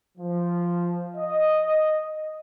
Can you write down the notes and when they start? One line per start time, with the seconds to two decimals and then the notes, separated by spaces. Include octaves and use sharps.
0.18 F3
1.16 D#5